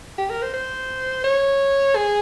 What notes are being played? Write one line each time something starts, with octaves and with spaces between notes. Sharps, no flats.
G4
A#4
C5
C5
C#5
G#4